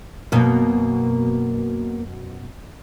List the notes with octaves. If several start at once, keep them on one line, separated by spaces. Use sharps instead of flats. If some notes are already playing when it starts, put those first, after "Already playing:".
F#2 B2 A#3 A#4